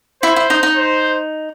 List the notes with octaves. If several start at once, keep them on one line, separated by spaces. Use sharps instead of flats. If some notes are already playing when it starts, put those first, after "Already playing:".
E4 C5
E4
D#4
D#4
C5